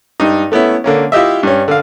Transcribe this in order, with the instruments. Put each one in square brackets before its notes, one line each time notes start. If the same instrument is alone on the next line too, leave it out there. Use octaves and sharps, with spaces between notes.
[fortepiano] G2 D#4
A3 B3 C#4 E4
D3 A#3 C#4
E4 F4 G4 D#5 E5
G2 C#4
D3 F5